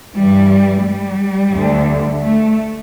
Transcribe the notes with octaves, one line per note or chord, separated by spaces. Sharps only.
G2 E3 G3
G3
D2 D3
A3